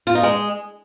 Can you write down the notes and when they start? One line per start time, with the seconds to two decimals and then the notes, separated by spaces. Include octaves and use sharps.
0.07 F4
0.15 D#4
0.23 G#3